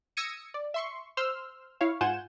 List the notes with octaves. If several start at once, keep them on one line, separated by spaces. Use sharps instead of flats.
D#6 E6 G#6 A#6 C#7 D#7
D5
E5 C6 C#6
C5 C6 E6 F6
E4 C#5 F5
G#2 F4 F#5 G#5 G6 E7